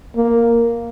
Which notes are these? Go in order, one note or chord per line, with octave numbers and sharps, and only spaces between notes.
A#3